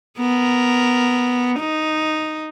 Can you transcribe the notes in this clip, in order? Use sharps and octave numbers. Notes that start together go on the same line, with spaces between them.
B3 A#4
D#4